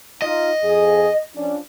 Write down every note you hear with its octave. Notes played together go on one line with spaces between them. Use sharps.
D#4 F4 D#5
F2 G#4
F3 C#4 D4